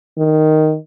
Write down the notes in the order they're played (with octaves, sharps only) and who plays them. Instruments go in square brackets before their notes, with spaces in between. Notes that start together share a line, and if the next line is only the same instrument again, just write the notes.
[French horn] D#3